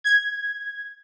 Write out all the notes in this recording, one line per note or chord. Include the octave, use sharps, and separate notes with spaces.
G#6